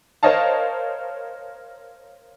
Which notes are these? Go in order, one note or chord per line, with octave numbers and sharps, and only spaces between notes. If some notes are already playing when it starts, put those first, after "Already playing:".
A#4 C5 C#5 D#5 F5 A5